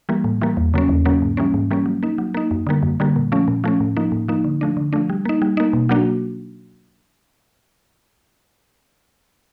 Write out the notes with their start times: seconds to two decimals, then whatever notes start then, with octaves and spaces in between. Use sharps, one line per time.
0.09 E3 G3 A#3
0.24 A2
0.41 E3 G3 A#3
0.57 E2
0.74 C#3 F#3 A#3 C#4
0.89 E2
1.05 C#3 F#3 A#3 C#4
1.22 G#2
1.37 E3 G3 A#3 C#4
1.54 G#2
1.71 E3 G3 A#3 C#4
1.86 F#3
2.03 A#3 D#4
2.18 F#3
2.34 A#3 D#4
2.51 F#2
2.67 D3 G3 A#3
2.83 F#2
3.00 D3 G3 A#3
3.16 A#2
3.32 F3 A3 C#4
3.48 A#2
3.64 F3 A3 C#4
3.80 A2
3.97 F3 A#3 D#4
4.12 A2
4.28 F3 A#3 D#4
4.44 D3
4.61 F3 A3 D4
4.77 D3
4.93 F3 A3 D4
5.10 G3
5.25 A#3 D#4
5.42 G3
5.57 A#3 D#4
5.73 B2
5.89 F#3 A#3 D4 F#4